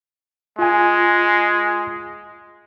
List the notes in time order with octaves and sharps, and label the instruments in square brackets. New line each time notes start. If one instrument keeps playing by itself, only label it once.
[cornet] G#3 [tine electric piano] F4 G#5